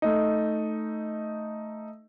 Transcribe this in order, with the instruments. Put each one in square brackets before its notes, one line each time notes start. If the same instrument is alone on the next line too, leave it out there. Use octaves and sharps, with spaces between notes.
[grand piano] A3 D#4